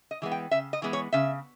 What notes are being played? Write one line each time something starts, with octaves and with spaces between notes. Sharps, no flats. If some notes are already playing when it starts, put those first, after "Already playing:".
D#5
E3 G#3 B3
G5
C#3 E5
D#5
E3 G#3 B3
C#5
C#3 E5